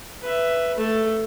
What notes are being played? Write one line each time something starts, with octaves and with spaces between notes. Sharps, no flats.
B4 E5
A3 A4